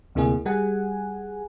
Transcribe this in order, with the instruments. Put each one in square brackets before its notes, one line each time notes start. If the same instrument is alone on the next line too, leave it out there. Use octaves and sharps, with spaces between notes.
[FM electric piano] D2 C3 A#3 E4 G#4
G3 G#4 F#5 G#5